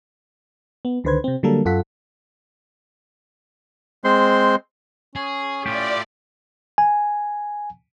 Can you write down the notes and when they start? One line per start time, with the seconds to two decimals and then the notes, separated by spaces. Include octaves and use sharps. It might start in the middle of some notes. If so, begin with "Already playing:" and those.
0.85 B3
1.04 C#2 D3 D#3 B4 C5 G#6
1.24 C3 C4
1.43 D3 F#3 G3 A#3 A4 A#4
1.65 F#2 F4 A4 F#5 B6
4.04 G#3 C4 C5 C6
5.16 C#4 G#4
5.66 A2 F4 G4 D5
6.78 G#5